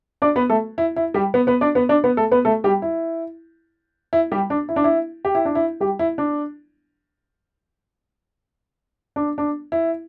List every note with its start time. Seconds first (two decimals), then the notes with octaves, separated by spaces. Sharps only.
0.22 D4 D5
0.36 B3 B4
0.50 A3 A4
0.78 E4
0.96 E4
1.14 G3 G4
1.34 B3 B4
1.47 B3 B4
1.61 D4 D5
1.75 B3 B4
1.89 D4 D5
2.04 B3 B4
2.17 A3 A4
2.32 B3 B4
2.45 A3 A4
2.64 G3 G4
2.82 E4
4.13 E4
4.32 G3 G4
4.50 D4
4.69 E4
4.76 D4
4.84 E4
5.25 G4
5.35 E4
5.45 D4
5.55 E4
5.80 G3 G4
5.99 E4
6.18 D4
9.16 D4
9.38 D4
9.72 E4